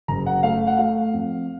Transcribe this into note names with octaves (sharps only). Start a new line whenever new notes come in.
F#1 A#5
F#5
A3 F5
F#5
A3 F5
F2